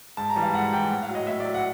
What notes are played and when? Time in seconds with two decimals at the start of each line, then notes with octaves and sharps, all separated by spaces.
0.17 G#2 A5
0.30 A#5
0.36 E3 G3
0.42 F5
0.54 G#2 F#5
0.73 E3 G3 G5
0.91 A2 F#5
1.02 F5
1.09 F#3
1.15 D#5
1.27 A2 E5
1.40 D5
1.46 F#3
1.54 F#5